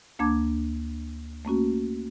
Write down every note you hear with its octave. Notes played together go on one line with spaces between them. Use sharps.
D2 A#3 D4 A5 D6 G#6
A3 A#3 C#4 F#4